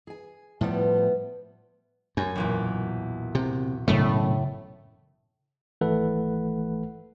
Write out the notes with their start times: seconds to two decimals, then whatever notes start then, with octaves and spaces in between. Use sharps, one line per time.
0.07 G#4 G#5
0.61 A2 F3 G3 B3 E4
2.17 F#2 G#5
2.35 B1 E2 A#2
3.35 C3
3.88 E1 F#2 A2 C#3 A3
5.81 G#1 E3 A3 A4 B4 F#5